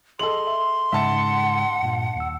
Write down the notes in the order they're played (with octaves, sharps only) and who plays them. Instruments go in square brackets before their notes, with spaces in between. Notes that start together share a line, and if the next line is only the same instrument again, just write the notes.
[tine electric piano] G#4 [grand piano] A4 D#5 F#7 [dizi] C6
[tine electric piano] E5
[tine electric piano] G#2 C#3 G#3 [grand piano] E5 A5 [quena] F#5
[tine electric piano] G2 A#2
D#2 E6